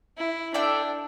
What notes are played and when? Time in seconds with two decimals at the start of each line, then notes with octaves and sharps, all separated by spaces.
0.17 E4
0.54 D4 E4 A4 D5 G5